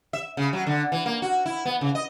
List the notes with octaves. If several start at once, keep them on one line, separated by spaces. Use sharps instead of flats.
E5
C#3
F#3
D3
E3
A#3
F#4
E4
B3
C#3
D#5